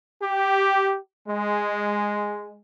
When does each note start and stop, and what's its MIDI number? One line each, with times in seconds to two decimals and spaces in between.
0.23 0.98 67
1.28 2.60 56